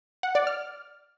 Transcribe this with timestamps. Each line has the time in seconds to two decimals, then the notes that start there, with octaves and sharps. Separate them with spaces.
0.23 F#5
0.35 D5
0.47 F6